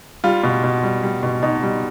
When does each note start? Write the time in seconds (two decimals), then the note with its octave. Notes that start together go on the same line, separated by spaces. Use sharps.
0.24 G3 F4
0.44 B2
0.64 B2
0.83 G3
1.03 G3
1.23 B2
1.43 B2 D#4
1.63 G3